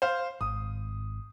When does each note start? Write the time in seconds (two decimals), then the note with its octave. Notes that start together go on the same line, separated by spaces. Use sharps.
0.02 C5 F5
0.41 G#1 D#6